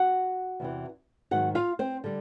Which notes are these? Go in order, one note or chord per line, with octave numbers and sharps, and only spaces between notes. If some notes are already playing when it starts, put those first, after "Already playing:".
Already playing: F#4 F#5
E2 C3 E3
G#2 D#3 F#3 F#4 F#5
F4 F5
C4 C5
D3 G3